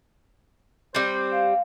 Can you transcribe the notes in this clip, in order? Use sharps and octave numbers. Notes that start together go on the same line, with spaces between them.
G3 C4 C5
F5